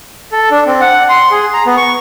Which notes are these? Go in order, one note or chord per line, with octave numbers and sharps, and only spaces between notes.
A4
D4
C4
F#5
C6
G#4
A#5
B3
C#6